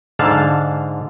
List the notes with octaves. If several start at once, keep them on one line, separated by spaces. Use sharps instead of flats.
G#2 D3 F5 A5